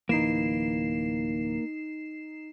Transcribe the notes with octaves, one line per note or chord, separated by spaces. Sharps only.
D1 C#2 E3 A#3 D#4 C7 E7